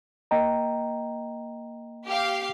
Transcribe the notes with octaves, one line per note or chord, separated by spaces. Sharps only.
A#3 D#5 G5 A#5
G4 F5